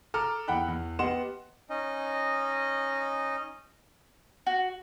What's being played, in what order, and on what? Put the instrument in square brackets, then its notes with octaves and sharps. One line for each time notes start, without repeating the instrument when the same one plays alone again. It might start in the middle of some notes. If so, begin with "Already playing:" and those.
[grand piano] A4 A#5 D6 F6
E2 F#5 G5 B5 F#6
E2
B3 G4 D#5 F#5 C6 E7
[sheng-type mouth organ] C#4 D#4 D#5
[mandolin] F#4